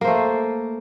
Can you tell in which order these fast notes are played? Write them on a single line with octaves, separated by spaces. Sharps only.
A#3 C5 A3